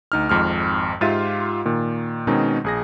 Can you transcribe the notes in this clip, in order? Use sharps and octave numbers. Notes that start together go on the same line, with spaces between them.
D2 D#4 F6
G#1 F2 G#2 F6
G#2 F4 G4 E5 A6 D#7
A#2 D#3
B2 D#3 G#3 C4 C#4 D#4
A#1 G#4 A#6